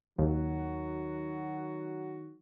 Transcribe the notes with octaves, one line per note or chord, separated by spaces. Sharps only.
D#2 D#3 F#3 F#4